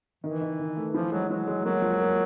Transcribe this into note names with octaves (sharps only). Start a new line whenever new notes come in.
D#3 E3
D#3
D#3
A3
E3 F3
F#3 G#3
E3 F#3
G#3
F#3 A#3
F3
A#3